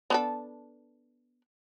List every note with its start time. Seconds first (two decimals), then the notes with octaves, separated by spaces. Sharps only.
0.10 B3 D4 A4